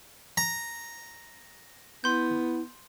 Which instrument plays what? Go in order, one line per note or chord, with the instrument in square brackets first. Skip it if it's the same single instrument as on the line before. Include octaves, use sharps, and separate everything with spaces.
[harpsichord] A#5
[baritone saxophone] B3 [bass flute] E4 [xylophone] C6 G6